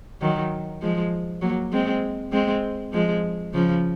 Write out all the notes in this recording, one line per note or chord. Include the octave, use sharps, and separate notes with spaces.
D#3 F#3
F3 G#3
F#3 A#3
G#3 C4
G#3 C4
F3 G#3
C#3 F3